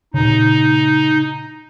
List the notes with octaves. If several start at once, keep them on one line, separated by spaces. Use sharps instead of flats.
A#2 C#3 D#4